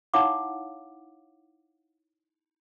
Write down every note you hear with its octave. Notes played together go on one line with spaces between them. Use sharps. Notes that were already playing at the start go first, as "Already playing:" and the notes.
D#4 E4 C#5 F5 F#5 D6